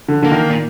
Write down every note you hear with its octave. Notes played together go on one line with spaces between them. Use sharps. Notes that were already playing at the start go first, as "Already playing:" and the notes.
D3
D3 A#3
D#3
A#2